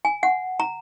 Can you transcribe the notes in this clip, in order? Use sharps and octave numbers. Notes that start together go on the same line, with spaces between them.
G#5
F#5
A#5